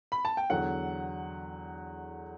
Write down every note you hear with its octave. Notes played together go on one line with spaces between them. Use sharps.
B5
A5
G5
E2 D3 F#3 F#5